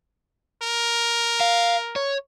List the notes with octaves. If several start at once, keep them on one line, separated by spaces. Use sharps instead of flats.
A#4
F5
C#5